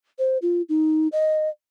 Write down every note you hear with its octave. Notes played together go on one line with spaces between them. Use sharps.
C5
F4
D#4
D#5